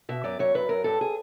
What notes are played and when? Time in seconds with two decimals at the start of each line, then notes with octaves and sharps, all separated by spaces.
0.09 B2 E5
0.24 F#2 D5
0.39 F#2 C#5
0.54 F#2 B4
0.69 F#2 A#4
0.84 G2 A4
1.01 G#4